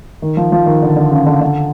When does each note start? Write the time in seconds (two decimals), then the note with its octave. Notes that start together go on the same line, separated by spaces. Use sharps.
0.22 D#3
0.37 F3
0.52 F3
0.66 D#3
0.82 D3
0.97 D3
1.12 C#3
1.26 D3
1.41 D3